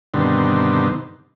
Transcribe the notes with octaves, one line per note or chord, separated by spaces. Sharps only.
G2 B2 D3 D#3 C4